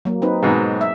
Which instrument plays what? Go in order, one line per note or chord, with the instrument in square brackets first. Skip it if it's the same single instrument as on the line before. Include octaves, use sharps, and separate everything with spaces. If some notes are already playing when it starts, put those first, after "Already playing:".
[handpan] F#3 A#3
C4 D#4 B4
[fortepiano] G#2 B2 F#3 [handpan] G#4
[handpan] E5